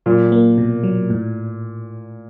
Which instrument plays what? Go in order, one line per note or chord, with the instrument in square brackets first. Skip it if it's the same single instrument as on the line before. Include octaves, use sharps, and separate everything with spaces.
[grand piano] A#2 [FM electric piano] F#3
[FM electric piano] A#3
B2
F#3
A2